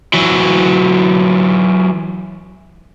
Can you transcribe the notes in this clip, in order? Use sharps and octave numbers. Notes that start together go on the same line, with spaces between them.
E3 F#3